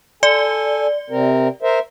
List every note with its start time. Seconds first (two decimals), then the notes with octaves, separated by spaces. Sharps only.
0.23 A4 D5 G#5
1.10 C3 C4 A#4
1.62 A#4 C5 E5